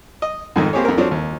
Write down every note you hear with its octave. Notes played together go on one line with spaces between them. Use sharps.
D#5
F2 G#2 D#3
A#3 C4 G4 G#4 C#5
F2 A#4
F3 F#3 C4 D4 C#5
D#2